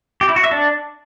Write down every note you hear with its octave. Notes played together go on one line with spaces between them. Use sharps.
G4
E4
F#4
E5
D4